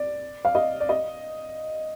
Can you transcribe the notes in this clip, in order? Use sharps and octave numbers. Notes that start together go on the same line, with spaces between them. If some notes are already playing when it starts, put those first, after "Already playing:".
Already playing: D5
F5
D#5
D5
D#5